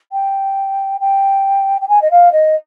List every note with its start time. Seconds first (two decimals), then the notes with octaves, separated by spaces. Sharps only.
0.12 G5
1.01 G5
1.81 G5
1.89 G#5
2.02 D#5
2.11 F5
2.32 D#5